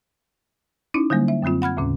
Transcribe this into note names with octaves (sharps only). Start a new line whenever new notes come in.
C#4 D#4 E4
D3 F#3 G3 A#3
E5
F#2 D3 F#3 C4 F4
F#5 B5 F6 G#6
D#2 A2 C#3 C#4